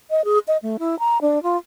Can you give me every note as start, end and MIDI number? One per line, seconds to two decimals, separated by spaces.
0.10 0.24 75
0.25 0.39 68
0.48 0.57 75
0.63 0.77 57
0.79 0.98 64
0.99 1.18 82
1.21 1.42 62
1.43 1.57 65